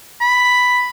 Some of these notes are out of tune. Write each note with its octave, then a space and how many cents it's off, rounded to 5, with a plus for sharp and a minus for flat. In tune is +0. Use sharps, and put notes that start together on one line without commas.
B5 +5